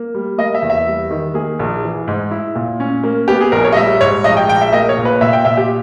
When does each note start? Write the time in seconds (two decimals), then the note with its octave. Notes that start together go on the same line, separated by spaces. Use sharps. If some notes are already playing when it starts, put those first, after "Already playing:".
Already playing: A#3
0.15 G3
0.38 A#3 D#5
0.55 E5
0.62 E2
0.70 E5
0.87 G3
1.11 D#3
1.34 A#3 G#4
1.59 A#1
1.83 E3
2.08 G#2
2.31 E4
2.56 A#2
2.80 C#4
3.03 A#3
3.28 B3 G4
3.41 G#4
3.52 A#1 A#4
3.64 C#5
3.72 D#5
3.76 G3 E5
4.01 G#2 C#5
4.24 A#1 D#5
4.37 G5
4.48 A#1 G5
4.61 E5
4.73 A#3 D#5
4.89 C#5
4.98 A#2
5.05 B4
5.21 A#2 E5
5.33 G5
5.45 A#2 E5
5.57 G4